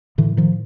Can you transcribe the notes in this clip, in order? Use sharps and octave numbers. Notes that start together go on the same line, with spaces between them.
A2 D3 E3
D#3 F3